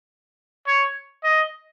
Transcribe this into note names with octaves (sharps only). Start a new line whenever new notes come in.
C#5
D#5